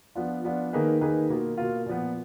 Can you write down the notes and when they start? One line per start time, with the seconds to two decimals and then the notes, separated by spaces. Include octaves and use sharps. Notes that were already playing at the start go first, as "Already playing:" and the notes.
0.15 F3 B3 D4 F4
0.44 F3 B3 D4 F4
0.73 D#3 A#3 D#4 G#4 B4
1.01 D#3 A#3 D#4 G#4 B4
1.29 B2 A#3 F4
1.57 B2 A#3 F4
1.86 A#2 F3 B3